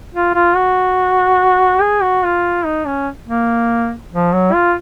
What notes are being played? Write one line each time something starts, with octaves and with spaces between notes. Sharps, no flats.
F4
F4
F#4
G#4
F#4
F4
D#4
C#4
A#3
F3
F#3
F4